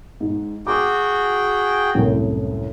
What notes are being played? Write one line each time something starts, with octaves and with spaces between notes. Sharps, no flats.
G#2
F#4 G#4 G5 D6
C2 F#2 A2